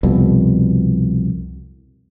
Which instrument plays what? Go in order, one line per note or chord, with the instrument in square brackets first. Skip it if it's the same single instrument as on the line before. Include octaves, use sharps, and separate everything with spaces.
[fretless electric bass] C2 F2 B2